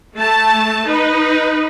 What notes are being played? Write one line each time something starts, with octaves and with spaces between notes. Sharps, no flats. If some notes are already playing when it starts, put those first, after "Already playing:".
A3 A5
D#4 B4